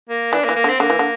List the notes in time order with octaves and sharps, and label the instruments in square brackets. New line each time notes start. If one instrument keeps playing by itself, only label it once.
[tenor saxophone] A#3
[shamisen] E3 [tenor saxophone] D4
[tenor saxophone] A#3
[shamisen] E3
[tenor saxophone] A#3
[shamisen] D3
[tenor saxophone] C4
[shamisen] D3 [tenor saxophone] A#3
[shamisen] E3
D3